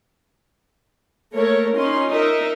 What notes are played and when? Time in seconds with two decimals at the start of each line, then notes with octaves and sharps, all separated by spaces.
1.35 A3 A#3 A4 A#4 C#5
1.76 C#4 D#4 F4 C6
2.10 D#4 A#4 E5